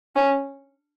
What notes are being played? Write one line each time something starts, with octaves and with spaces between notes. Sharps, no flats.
C#4